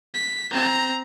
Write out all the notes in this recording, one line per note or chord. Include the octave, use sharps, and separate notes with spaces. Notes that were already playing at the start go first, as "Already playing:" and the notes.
B6
C4 A#5